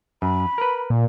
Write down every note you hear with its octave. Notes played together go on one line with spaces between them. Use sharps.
F#2 B5
A#4 B4
A#2